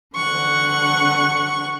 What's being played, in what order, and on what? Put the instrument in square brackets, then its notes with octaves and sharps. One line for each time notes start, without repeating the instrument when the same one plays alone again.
[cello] D3 F#5 [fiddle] C#6